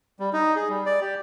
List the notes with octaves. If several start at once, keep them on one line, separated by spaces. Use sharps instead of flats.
G3
D#4
G#4
G3
D5
G4